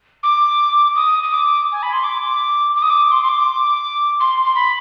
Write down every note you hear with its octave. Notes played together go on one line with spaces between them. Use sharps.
D6
D#6
D#6
D6
G#5
B5
C6
D6
D6
D#6
D6
C6
C6
D6
C6
C6
B5